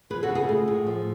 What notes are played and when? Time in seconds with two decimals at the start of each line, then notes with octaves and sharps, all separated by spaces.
0.10 F3 G#4 B4
0.23 F#4 A4
0.29 C#3
0.35 F4 G#4
0.49 A3
0.68 A2
0.87 F3